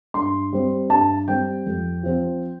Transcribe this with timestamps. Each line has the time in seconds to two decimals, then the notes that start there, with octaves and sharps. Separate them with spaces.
0.14 G2 C6
0.53 G3 C4
0.89 G2 A5
1.28 G3 C4 G5
1.66 F2
2.03 F3 C4